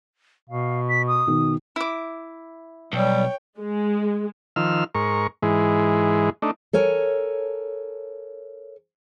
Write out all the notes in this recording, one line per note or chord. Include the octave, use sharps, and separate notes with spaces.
B2 F5
B6
D#6
B2 D#3
E4 D6
B1 G3 C#5 G5
G#3
D#3 F3 E6 F6
G#2 A#4 C#6
G#2 E3 G#3
A3 D4 D#4
A4 A#4 C#5 G#5